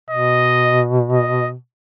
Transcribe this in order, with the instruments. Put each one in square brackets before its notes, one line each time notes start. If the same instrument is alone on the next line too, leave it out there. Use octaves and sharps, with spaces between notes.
[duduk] B2 [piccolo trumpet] D#5
[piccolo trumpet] D#5